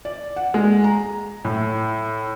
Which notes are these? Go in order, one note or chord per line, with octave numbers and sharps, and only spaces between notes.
D5
F#5
G#3
A#5
A2